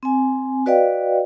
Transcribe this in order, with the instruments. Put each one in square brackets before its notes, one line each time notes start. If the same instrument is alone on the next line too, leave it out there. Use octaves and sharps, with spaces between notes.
[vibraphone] C4 G#5
F#4 B4 D5 D#5 F5 G5